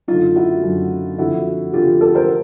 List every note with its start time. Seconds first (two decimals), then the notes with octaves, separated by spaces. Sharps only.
0.08 F#2 D3 D#4 F4
0.36 E4 F#4
0.63 F#2 D3
1.18 F2 D3 E4 F#4
1.73 F2 D3 F4 G4
2.01 G4 A4
2.15 A#4 C5